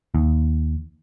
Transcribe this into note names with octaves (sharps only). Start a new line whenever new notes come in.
D#2